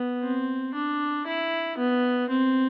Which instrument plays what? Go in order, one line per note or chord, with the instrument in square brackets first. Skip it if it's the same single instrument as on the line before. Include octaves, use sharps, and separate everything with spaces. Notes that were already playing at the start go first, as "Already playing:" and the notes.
Already playing: [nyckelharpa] B3
C4
D4
E4
B3
C4